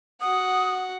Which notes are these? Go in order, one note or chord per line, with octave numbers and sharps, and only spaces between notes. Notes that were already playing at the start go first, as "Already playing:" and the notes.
F#4 F#5 D#6